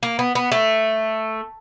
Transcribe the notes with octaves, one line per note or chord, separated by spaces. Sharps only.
A#3
B3
B3
A3